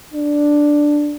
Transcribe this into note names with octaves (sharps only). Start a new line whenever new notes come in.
D4